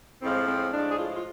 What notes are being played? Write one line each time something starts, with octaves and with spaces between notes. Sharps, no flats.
A2 F3 G#3 C4
C4
A2 F3 G#3 D4
G#4
F4
F4